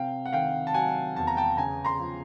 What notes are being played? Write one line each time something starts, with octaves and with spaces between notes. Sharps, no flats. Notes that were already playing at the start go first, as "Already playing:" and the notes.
Already playing: C3 F5 G5
F#5
D#3 F5 G5
A5
F#3 F#5 G#5
E2 A5
A#5
G5 A5
C#3 G#5 A#5
A#5 C6
F3